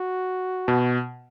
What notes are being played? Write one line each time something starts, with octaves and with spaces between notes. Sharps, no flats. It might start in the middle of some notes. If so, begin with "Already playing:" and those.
Already playing: F#4
B2